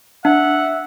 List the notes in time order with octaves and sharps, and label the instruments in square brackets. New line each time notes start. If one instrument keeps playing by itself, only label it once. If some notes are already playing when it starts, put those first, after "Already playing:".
[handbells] D4 [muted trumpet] E5 [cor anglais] F#5